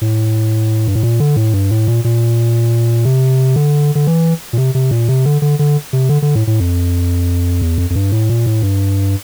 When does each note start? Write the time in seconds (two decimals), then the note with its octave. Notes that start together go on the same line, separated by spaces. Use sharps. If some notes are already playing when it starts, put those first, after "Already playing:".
0.01 A2
0.88 G2
0.95 A2
1.03 A#2
1.20 D3
1.36 A2
1.54 G2
1.71 A2
1.88 A#2
2.04 A#2
3.05 C3
3.56 D3
3.95 D3
4.07 E3
4.53 A#2
4.57 C3
4.75 C3
4.91 A#2
5.08 C3
5.25 D3
5.42 D3
5.59 D3
5.93 C3
6.09 D3
6.22 D3
6.35 A2
6.47 A2
6.60 F2
7.61 E2
7.78 F2
7.90 F2
7.95 G2
8.12 A2
8.29 A#2
8.46 A2
8.62 G2